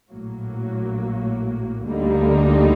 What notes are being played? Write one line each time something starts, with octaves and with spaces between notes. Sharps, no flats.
A#1 A2 F#3 A#3
D2 D3 G3 A#3 D#4